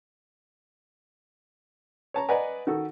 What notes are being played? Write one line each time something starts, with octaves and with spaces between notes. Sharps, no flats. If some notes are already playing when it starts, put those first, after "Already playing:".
C#5 A5 A#5
B4 D5 D#5 F#5 G#5 A#5
D#3 F#4 A4